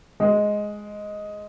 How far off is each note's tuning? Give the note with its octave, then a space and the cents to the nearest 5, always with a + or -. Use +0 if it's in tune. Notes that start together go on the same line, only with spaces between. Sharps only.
G#3 +5